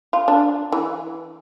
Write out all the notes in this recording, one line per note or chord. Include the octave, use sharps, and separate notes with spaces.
F4
D4
E3